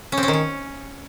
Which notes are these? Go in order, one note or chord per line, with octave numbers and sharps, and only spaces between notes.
C#4
C4
C#4
D#3
C#4